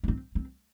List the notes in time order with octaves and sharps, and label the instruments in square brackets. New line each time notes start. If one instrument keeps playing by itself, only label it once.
[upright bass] C#4
C4
C4